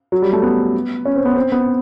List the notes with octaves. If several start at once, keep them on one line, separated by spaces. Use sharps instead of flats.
F#3
G3
A3
B3
C#4
C4
B3
C4
B3